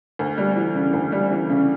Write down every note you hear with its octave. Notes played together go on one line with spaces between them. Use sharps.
D2
G3
E3
C#3
D2
G3
E3
C#3